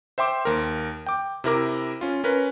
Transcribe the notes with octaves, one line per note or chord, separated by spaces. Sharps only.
C5 E5 G5 C6 D6
D#2 A#4
G5 D6
C3 E4 A#4 D6
C#4 F4
C#4 A#4 B4